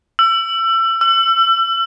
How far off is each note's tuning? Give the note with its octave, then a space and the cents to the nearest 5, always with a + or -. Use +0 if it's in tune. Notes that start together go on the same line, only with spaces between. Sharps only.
E6 +30
E6 +40